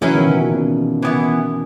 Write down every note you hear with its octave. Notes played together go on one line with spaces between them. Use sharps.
C#3 E3 F#3 C#4 E4 B4
B2 D#3
B2 D#3
A#2 C#3
B2
E3 B3 E4